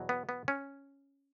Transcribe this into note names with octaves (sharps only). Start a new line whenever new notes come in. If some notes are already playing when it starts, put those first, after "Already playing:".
Already playing: E2 B2 F#3
B3
B3
C#4